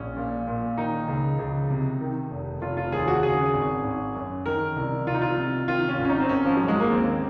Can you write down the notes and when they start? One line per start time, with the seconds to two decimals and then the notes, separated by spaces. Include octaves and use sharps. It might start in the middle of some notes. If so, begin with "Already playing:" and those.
Already playing: A#1 C#4
0.17 A#2
0.47 A#2
0.78 D#3 D#4
1.08 C#2
1.39 C#2
1.70 C3
2.01 D#3
2.31 F1
2.62 F1 F4
2.77 F4
2.92 D#2 G#4
3.08 F#4
3.23 C#3 G#4
3.54 G#1
3.84 G#1
4.15 F#2
4.46 D#3 A#4
4.76 C2
5.07 C2 F4
5.14 D#4
5.21 F4
5.38 C3
5.68 D#3 F4
5.89 C#4
5.99 G#1
6.05 C#4
6.09 D#4
6.20 C4
6.29 G#1 C#4
6.46 F3
6.57 G#2 F#3
6.68 G#3
6.80 A#3
6.91 D#2 C4